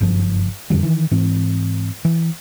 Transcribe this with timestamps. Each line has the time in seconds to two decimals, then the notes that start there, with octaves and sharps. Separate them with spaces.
0.01 F#1 G2 F3
0.70 F2 D3 F3 G3
0.83 D#3 E3
1.11 G#2 E3 C4
2.05 E3